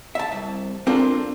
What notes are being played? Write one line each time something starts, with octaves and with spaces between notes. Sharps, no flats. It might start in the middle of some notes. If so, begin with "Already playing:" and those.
E5 A5
C2
C4 D4 F4 A4 A#4